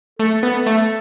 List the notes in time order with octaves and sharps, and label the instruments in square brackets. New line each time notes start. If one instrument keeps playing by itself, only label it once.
[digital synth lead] A3 [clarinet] A4
[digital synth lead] B3
A3